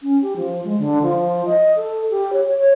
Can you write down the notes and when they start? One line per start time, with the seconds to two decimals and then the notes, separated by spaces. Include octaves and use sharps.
0.02 C#4
0.21 G4
0.36 F3
0.64 G#3
0.78 D3
1.02 F3
1.45 D#5
1.76 A4
2.10 G4
2.33 C#5
2.57 C#5